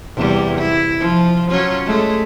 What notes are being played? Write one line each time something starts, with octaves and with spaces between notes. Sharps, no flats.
E2 C3 G3
E4
F3
F#3 C#4 F4
G#3 A3